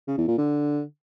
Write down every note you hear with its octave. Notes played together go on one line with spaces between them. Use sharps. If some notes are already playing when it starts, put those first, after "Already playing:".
C#3
E2
A#2
D3